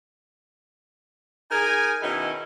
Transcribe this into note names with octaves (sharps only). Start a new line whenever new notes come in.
D#4 G#4 A#4 G#5
B2 D#3 C#4 D#4 E4